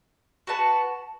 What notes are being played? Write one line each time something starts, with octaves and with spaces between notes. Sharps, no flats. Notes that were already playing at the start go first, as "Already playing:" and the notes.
F#4 B4 A5